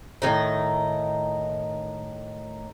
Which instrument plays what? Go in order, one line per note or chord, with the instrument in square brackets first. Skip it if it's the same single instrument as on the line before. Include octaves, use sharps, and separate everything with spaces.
[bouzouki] A2 D#3 D#4